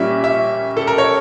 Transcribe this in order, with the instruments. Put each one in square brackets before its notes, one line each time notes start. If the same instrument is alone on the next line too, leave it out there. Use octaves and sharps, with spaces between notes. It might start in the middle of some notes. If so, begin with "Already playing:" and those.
Already playing: [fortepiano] A#2 G3 C#4 G4 [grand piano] E5
[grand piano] E5
A4
A#4
C#5